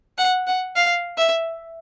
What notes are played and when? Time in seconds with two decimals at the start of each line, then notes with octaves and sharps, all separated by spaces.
0.18 F#5
0.47 F#5
0.76 F5
1.18 E5